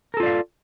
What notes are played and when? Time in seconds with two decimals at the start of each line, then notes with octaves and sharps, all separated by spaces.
0.14 A#4
0.17 A4
0.20 F4
0.23 D5
0.26 F5